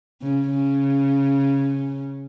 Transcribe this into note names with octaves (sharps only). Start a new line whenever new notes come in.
C#3
C#3